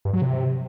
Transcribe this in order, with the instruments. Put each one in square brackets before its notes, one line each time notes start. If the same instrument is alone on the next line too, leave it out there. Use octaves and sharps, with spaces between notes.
[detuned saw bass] G2
F#3
C3